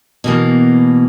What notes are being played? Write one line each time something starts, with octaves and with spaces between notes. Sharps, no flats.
B2 E3 A#3